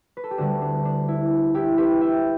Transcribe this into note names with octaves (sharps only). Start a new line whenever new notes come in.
B4
A4
G4
D2 D3 G3 D4 F#4
D4
D4
E4
E4 G4
G4 B4
E5 G5